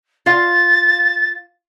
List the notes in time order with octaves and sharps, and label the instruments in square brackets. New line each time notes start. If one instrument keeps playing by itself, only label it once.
[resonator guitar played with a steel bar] F4 F5 [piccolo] A6